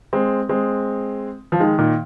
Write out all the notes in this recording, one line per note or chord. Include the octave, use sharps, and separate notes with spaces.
G#3 C4
G#3 C4
F3
D#3 G#3
A#2 D#3